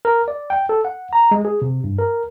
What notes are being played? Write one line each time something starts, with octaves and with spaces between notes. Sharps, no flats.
A#4
D5
G5
A4
F#5
A#5
G#3
G#4
C3
G2
A#4